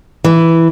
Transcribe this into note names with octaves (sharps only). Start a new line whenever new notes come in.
E3